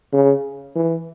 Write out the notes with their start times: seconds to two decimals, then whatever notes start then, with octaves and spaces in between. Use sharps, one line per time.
0.13 C#3
0.76 E3